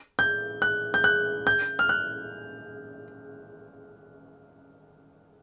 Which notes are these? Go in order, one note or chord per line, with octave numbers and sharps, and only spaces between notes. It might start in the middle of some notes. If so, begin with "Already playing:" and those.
G6
F#6
G6
F#6
G6
F6
F#6